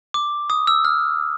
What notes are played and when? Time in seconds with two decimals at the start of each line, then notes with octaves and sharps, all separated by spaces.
0.14 D6
0.50 D#6
0.67 E6
0.85 F6